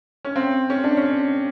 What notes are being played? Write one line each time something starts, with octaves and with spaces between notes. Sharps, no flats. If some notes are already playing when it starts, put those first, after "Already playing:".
C#4
C4
C#4
D4
C#4